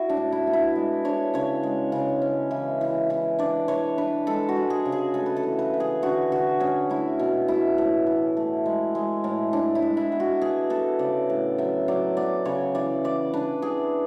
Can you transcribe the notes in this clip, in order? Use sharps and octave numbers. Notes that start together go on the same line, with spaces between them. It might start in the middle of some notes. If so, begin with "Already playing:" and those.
Already playing: E4 F#4
D4
A2
E4
B3
E4
G#3
D4 C#5
C#3 C#5
G#3
C#3
C#4
E3
E3
E3
D4 D5
E3 C#5
D4 B4
G#3 A4
F#4
G#3
G#4
C#3
G#4
A3 A4
B4
A4
E3
B4
E3
G#4
D3 F#4
D3 F#4
C#4 G#4
A3 E4
B2
B2 E4
A2
E3
A3
G#3
G#3
A2
A2 D4
E4
G#3
E4
B3
F#4
B3 G#4
B3 A4
C#3 D5
A2
F#3 E5
F#3 D5
B3 D5
C#3 C#5
E3 D5
E3 D5
D4 B4
E3 G#4